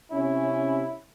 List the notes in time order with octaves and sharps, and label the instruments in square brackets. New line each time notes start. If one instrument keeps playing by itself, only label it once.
[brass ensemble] C3 C#4 [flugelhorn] E4